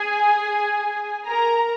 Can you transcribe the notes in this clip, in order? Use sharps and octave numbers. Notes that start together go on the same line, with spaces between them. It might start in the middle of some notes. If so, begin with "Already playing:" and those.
Already playing: G#4 G#5
A#4 A#5